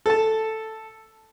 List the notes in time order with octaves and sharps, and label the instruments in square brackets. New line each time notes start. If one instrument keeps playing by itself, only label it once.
[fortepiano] A4 A5